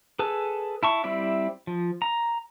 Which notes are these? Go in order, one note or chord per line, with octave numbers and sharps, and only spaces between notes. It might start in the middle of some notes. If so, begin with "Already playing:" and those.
G#4 A4 B4 A5
E4 A5 C#6
G3 C4 E4 D5 E5
F3
A#5